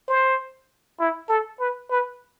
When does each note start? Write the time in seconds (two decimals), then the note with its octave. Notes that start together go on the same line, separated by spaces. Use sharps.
0.08 C5
1.00 E4
1.29 A4
1.60 B4
1.90 B4